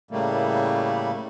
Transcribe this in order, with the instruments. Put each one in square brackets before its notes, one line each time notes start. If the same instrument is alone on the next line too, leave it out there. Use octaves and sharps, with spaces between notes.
[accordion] A2 C#3 G3 A3 A#3